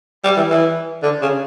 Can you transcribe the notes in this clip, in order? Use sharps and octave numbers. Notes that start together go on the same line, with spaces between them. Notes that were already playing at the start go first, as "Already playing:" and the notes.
G3
E3
E3
D3
C#3